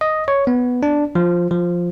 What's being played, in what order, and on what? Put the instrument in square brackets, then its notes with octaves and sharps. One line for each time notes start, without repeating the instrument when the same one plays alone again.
[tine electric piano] D#5
C#5
B3
D4
F3
F3